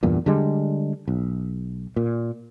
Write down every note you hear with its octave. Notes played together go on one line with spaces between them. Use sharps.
E2 G2 A#2
D3 G3 G#3
B1
A#2